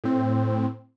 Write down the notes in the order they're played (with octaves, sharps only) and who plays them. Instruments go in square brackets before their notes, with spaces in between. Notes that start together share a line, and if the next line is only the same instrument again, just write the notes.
[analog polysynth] A2 C4